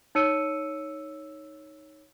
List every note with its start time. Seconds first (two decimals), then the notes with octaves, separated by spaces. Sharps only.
0.15 D#4 C#5 E6 C#7 D#7